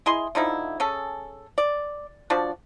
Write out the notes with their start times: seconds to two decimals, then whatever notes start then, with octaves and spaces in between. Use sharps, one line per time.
0.06 E4 G#4 D#5 C6
0.35 D3 F3 D#4 E4
0.80 C#4 G#4 A4
1.58 D5
2.30 F3 D4 F#4 D5